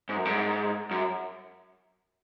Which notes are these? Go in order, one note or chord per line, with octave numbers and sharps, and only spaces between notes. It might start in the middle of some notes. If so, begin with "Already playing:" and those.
G#2
F#2
G#2
F#2